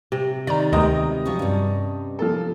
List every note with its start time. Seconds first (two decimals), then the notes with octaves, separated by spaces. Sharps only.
0.12 C3
0.47 D#3 D5 A#5
0.73 D2 C3 G#3 B3 C4 D#5 A#5
1.25 F3 F#3 C#4
1.39 G2 C#4
2.19 F3 A4